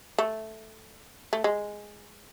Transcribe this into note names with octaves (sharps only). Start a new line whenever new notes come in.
A3
A3
G#3